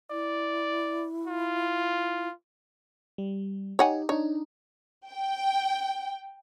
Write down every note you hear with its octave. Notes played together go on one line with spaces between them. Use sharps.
E4 D5
F4
G3
D#4 G4 C#5 F#5 G#5
D4 D#4 C#5
G5